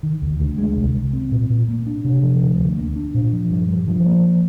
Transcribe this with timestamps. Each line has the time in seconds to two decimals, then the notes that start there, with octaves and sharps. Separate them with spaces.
0.03 D#3
0.22 D2
0.40 D2
0.58 G#3
0.76 C2
0.95 C2
1.13 C4
1.31 A#2
1.50 A#2
1.68 A#3
1.87 D4
2.05 C3
2.23 F3
2.41 D2
2.60 D2
2.78 A#3
2.96 D4
3.14 A#2
3.33 F3
3.51 G2
3.69 G2
3.88 F3
4.06 A#3